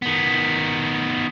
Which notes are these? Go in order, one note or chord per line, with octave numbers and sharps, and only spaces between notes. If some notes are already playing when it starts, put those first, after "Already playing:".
D#3 B3